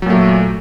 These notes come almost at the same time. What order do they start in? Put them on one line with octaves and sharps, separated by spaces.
F#3 A#2 A3